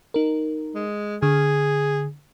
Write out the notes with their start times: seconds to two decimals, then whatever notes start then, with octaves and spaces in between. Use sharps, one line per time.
0.14 D#4 A#4
0.75 G#3
1.23 D3 G#4